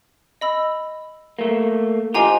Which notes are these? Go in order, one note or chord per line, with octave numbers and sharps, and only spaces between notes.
D#5 B5 E6
A3 A#3
F3 F4 G4 D#5 G#5 A#5